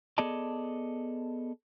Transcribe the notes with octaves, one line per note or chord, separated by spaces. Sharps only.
B3 G#4 A4 D5 D#5 A5